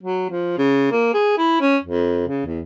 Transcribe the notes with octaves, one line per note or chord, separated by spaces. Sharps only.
F#3
F3
C#3
A#3
G#4
E4
C#4
F2
C#3
E2